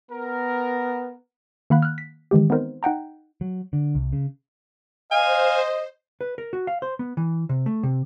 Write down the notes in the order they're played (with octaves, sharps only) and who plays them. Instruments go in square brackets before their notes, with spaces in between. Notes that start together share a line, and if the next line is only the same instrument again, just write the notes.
[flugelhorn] B3 [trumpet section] A#4
[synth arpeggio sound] D#3 A#3 F5 F#5 B5 F#6
F6 F#6
B6
D#3 E3 G#3 G4
B3 C4 D#4 A#4 C5
D#4 F#5 G5 A#5
[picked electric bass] F#3
D3
C2
C#3
[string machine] C5 [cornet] D#5 [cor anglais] F5 [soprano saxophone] G#5
[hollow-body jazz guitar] B4
A#4
F#4
F5
C5
B3
E3
C3
A3
C3